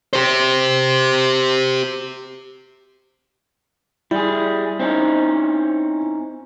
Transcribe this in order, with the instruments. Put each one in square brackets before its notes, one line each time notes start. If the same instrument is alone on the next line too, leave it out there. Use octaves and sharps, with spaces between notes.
[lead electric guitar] G4 C5
[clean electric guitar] G3 G#4 [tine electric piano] E4
[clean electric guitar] C4 C#4 D#4